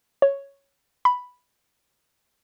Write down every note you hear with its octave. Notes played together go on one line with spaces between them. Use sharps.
C#5
B5